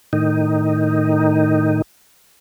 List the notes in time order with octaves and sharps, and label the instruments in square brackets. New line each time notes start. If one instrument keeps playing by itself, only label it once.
[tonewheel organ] A2 D#3 D#4